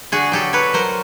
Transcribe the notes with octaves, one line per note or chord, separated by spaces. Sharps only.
D3 F#4 G#4
F#3 G4 A4
F#3 B4 C#5
F#3 A#4 C5